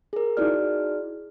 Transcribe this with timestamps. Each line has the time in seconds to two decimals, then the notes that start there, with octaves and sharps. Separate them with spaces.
0.13 G#4 A#4
0.37 D#4 E4 F#4 G#4 D5 F6